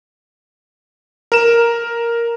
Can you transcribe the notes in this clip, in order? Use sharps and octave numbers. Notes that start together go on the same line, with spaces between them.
A#4 E7